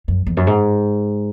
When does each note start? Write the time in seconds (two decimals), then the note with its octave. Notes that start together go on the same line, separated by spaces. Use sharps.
0.08 F#2
0.27 E2
0.37 F#2
0.47 G#2